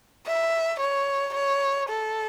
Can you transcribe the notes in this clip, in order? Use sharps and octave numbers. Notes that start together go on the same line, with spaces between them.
E5
C#5
C#5
A4